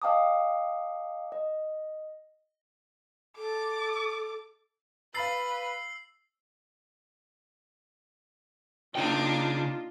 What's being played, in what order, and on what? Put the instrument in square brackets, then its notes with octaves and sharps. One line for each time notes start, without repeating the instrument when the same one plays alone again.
[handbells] D#5 F5 G5 A5 D6 D#6
D#5
[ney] A4 [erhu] D6
[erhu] B4 [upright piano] F5 B5 A6 [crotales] E6 C7 F#7
[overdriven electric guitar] C#3 G5 [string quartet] A#3 D4 D#4 [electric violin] F4